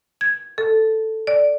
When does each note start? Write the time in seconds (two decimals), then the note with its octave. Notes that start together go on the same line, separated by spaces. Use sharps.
0.21 G#6
0.58 A4
1.27 D5